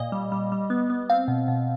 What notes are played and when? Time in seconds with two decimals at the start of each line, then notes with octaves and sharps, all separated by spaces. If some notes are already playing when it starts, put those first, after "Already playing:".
Already playing: A#2 D#5
0.12 G3
0.32 G3
0.52 G3
0.70 B3
0.90 B3
1.10 C4 F5
1.28 B2
1.48 B2